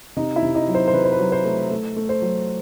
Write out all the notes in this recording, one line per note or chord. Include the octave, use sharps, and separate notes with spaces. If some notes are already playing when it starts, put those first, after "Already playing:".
C3 D#4 D#5
E4 E5
C3
D#4 D#5
F#3
C5
C5
C3 B4
C5
B4
F#3
C5
A3
A3
A3
C5
F#3